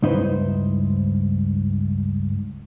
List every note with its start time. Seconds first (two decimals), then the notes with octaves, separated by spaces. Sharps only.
0.02 C#2 G2 D#4 E4 B4 C5